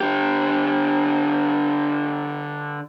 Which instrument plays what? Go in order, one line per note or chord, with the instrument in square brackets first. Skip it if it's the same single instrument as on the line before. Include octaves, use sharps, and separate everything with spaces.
[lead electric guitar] D3 G4